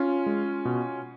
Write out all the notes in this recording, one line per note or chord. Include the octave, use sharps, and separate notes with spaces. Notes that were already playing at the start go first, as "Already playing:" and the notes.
Already playing: C#4 F4
G#3
B2